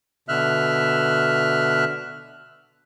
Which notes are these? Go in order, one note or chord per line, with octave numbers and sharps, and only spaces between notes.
B2 D3 E5 F6 F#6